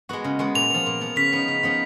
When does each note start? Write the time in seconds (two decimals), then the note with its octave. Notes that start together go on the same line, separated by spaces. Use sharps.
0.09 G#3 B3 F#4
0.24 C#3
0.39 G#3 B3 F#4
0.55 A#2 F7
0.70 F3 B3
0.86 A#2
1.01 F3 B3
1.16 C#3 B6
1.32 F3 B3 D#4
1.48 C#3
1.63 F3 B3 D#4